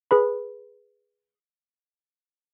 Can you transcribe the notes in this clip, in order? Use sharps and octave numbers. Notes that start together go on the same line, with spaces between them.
G#4 B4 B5